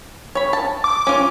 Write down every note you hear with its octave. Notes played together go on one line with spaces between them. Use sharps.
C#5 B5
A5
D6
C#4 F4